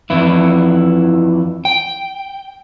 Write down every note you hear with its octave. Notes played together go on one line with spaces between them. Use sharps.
F2 E3 E4
G5